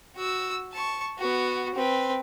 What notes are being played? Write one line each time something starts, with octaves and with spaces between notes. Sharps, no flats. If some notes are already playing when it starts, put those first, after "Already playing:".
F#4 E6
A5 C#6
B3 F#4
C4 B4